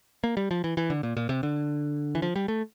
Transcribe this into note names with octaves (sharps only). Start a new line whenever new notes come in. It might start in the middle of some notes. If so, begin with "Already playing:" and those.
A#3
G3
F3
E3
E3
D3
A#2
A#2
C3
D3
E3
F3
G3
A3